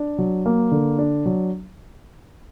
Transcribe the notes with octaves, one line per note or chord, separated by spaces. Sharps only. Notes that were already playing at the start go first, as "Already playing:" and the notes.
Already playing: D4
F#3
A#3
D3
D4
F#3